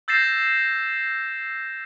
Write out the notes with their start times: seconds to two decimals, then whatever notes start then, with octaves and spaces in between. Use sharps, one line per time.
0.08 E6 G6 A6 A#6 C7 E7